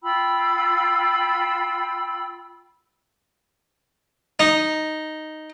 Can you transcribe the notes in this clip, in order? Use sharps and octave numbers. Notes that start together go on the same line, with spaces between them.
F4 G5 B5 E6
D#4